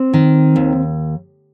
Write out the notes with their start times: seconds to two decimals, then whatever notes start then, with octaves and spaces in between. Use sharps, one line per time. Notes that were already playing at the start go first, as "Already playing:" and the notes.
Already playing: C4
0.13 D#3
0.56 D#2